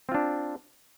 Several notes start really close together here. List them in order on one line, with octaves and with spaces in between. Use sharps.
C4 F4 D4